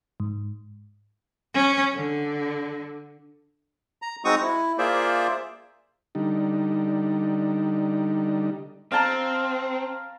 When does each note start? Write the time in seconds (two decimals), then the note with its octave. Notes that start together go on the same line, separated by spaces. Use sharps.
0.20 G#2
1.54 C#4
1.95 D3
4.02 A#5
4.25 G#3 C4 D#4 F#4 C#6 D#6
4.43 E4
4.78 A#3 F4 G#4 C5 D5 E5
6.15 D3 G3 D#4
8.92 C4 F5 A5 A#5